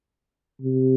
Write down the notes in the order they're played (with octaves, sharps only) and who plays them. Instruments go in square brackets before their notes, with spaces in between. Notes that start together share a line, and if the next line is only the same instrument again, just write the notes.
[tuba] C3